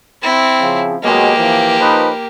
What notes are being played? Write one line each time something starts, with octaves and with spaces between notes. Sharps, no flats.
C4 E4
C#3 F3
B2 F#3 G#3 A#3 G4
E3 F3
F3 D#4 B4